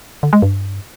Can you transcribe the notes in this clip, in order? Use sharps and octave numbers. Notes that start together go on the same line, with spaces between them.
D3
G#3
G2